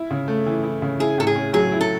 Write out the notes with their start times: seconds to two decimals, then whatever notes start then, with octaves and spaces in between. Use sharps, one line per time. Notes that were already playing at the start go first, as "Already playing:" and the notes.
Already playing: E4
0.11 C#3
0.28 A3
0.46 E3
0.64 E4
0.82 C#3
1.00 E4 G#4
1.18 A2 A4
1.27 G#4
1.36 C#4
1.53 F#3 G#4
1.72 E4
1.81 A4